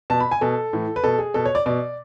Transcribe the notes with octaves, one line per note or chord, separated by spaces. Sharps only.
B2 A5
B5
G#5
B2 A4
A2 E3
B4
B2 A4
G#4
B2 A4
C#5
D5
B2 D5